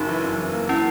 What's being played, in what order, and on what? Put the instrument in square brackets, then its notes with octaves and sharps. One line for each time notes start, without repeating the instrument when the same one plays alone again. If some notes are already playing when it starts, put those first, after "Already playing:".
Already playing: [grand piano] F#1 F#2 [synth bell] D#4 F#4
[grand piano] E3
F#1
E3
A#3
[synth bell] C#4 E4